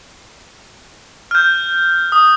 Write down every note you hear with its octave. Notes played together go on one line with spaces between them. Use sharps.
F6 G6
D#6